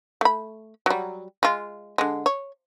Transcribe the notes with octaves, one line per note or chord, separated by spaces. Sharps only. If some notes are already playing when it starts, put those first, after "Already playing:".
A3 B5
F#3 G3
G#3 F4
D3 G#3
C#5